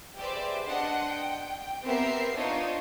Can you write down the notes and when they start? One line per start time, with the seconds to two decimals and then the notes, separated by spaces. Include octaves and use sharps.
0.18 G4 G#4 B4 C5 D5 E5
0.64 D4 D#5 F#5 C6
1.07 G5
1.83 B3 C4 G4 A#4 E5 C7
2.35 D4 D#4 F4 C5 C#5